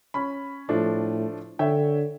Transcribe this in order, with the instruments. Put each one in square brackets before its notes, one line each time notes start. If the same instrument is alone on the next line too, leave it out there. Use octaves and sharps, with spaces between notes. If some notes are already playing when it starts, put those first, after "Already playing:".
[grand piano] C#4 B5
[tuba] A2 [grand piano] F3 A3 D4
[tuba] D3 [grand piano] C#5 E5 G5